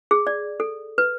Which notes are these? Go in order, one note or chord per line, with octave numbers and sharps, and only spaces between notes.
G#4
D5
A4
B4